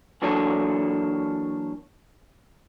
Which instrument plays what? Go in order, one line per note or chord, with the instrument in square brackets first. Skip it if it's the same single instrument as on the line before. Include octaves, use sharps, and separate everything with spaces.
[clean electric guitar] E3 F#3 A#3 D4 A4 C#5